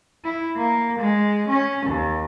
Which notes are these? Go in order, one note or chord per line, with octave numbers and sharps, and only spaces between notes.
E4
A#3
G#3
C#4
D#2